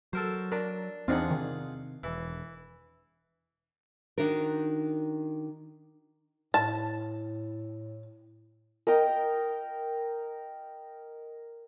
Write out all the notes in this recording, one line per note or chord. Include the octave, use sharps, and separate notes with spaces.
F#3 A4 A#4 C5
D4 A#4
E2 C4 D4 D#4 F4 G#4 F#5
C3 D#3
E1 E3
D#3 D4 D#4 F#4 A#4
A2 A5
A#4 D#5 G5